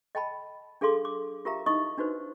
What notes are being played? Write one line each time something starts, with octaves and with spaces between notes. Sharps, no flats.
D#5 G5 A5 B5
D4 G#4 A4 F5 C6 D6
D6
F4 G4 A#4 E5 F5 A#5
D#4 E4 D#5 C#6 D#6
D4 D#4 F#4 B4 C5